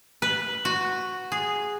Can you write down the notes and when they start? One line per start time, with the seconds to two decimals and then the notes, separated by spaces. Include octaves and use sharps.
0.22 B4
0.65 F#4
1.32 G#4